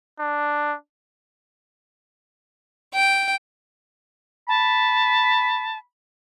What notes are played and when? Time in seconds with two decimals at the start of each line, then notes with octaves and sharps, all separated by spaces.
0.19 D4
2.94 G5
4.48 A5 B5